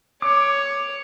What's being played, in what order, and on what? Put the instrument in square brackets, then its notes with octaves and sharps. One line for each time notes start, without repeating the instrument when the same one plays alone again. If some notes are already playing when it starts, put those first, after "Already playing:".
[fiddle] C#5 [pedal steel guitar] D6